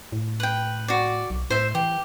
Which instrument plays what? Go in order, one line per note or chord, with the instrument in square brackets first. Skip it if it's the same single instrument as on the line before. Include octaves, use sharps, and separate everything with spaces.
[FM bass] A2
[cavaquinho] B4 G5
F#4 D5
[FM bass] B1
[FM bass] A2 [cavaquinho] C5 E5
[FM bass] E3 [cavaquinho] G4